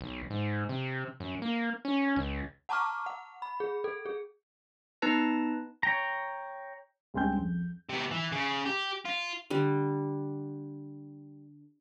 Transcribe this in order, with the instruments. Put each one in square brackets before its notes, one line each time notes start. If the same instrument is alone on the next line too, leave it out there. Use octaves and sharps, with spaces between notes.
[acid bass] B1
G#2
C3
F#2
A#3
C#4
C#2
[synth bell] F#5 A5 A#5 C#6 D6 F6
F#5
B5
G#4
A4
G#4
[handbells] B3 D#4 B4 A5 A#6
[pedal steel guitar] C#5 G5 A#5
[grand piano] C#2 G2 C4 G5 G#5 G6
F2
[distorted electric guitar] C3 B3
E3
C#3
G4
F4
[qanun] D3 G3